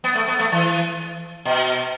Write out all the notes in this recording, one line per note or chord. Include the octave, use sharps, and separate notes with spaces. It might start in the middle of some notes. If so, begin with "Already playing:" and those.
B3
A3
B3
A3
E3
B2